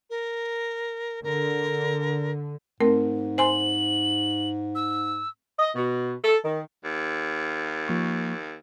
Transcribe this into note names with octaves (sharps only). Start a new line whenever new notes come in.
A#4
D3 A#4
G#2 A3 C4 A#4
C5 G#5 C6 F#7
E6
D#5
B2
A4
D#3
D#2
F3 A#3 C#6